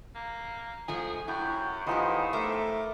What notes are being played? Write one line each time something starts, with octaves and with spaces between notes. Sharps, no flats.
A#3
F3 G#3 A3 G#4
F#2 E4 F#4 G5
A2 E3 F3 B3 D#4 F4 G4 G#4
A3 A#4 C5 E5 D6